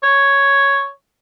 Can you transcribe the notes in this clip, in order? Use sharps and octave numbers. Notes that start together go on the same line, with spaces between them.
C#5